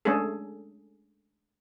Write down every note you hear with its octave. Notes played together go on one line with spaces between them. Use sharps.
G#3 A3 C#4 D4 G#4 A4